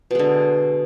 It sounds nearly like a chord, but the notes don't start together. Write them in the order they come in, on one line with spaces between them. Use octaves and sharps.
B2 G#3 D3